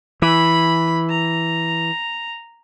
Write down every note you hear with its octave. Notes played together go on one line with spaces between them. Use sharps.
E3 B5
A#5